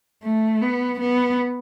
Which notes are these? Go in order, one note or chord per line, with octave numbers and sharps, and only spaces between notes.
A3
B3
B3